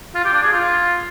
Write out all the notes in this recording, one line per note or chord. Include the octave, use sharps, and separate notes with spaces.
F4
G4
D4
G#4
F4